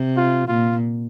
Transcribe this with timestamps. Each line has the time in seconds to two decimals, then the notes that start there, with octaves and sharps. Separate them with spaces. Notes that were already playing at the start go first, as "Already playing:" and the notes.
Already playing: C3
0.16 F4
0.47 A#2 F4